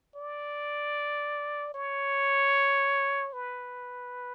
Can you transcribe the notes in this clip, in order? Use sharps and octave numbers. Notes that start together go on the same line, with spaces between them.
D5
C#5
B4